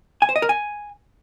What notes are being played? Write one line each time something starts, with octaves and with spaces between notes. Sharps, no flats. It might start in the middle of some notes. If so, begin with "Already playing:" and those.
G#5
C5
D#5
A#4
G#5